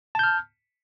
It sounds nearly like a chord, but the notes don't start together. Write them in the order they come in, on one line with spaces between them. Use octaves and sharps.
A5 G6 F6